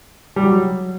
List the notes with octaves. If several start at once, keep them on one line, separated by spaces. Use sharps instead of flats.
G3
F#3